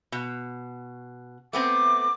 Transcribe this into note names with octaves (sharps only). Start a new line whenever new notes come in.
B2
A3 B3 C4 D6